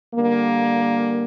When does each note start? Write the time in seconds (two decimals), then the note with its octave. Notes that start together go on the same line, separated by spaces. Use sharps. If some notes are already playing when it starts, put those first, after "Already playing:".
0.15 D3 G3 A#3